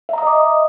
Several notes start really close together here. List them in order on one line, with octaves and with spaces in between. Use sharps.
E5 A#5 D#6 D#5 D6